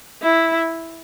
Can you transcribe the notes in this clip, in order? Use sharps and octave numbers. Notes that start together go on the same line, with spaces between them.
E4